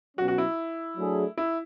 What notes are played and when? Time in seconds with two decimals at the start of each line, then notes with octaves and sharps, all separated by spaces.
0.17 B2 F#3 C#4 F#4
0.28 F#4
0.38 E4
0.97 F#3 A3 D4 G#4
1.37 E4